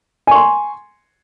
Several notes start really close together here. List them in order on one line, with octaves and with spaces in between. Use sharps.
G#5 C#6 C6